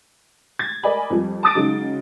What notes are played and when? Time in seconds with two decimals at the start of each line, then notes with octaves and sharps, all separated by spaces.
0.59 G#6 A6
0.83 A#4 D5 D#5 G#5 B5
1.10 F2 F3 G3
1.43 A5 D6 D#6 A6 D7
1.55 C#3 F#3 G#3 D#4 F#4